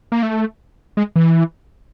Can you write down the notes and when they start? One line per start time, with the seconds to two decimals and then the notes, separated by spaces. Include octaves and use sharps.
0.12 A#3
0.23 A3
0.97 G#3
1.16 E3